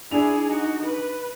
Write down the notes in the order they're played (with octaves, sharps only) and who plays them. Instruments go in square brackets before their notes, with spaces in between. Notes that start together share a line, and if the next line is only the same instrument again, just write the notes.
[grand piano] D4 F7 [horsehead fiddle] E4 G#4
[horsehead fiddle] D#4 F#4
B4